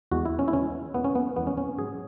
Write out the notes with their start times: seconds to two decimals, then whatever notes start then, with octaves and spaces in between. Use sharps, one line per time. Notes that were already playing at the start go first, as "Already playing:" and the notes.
0.11 E2 E3 G#3 F#4
0.25 E4
0.39 C#4
0.48 E4
0.53 E2 E3 G#3 C#4
0.94 E2 E3 G#3 B3
1.04 C#4
1.15 B3
1.36 E2 E3 G#3 B3
1.47 C#4
1.57 C#4
1.78 G#2 F#3 G#4